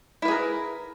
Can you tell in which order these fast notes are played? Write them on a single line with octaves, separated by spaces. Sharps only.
E4 B4 G#4 A#4